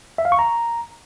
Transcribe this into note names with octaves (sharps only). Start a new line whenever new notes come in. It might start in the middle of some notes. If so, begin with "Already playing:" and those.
E5
F5
C#6
A#5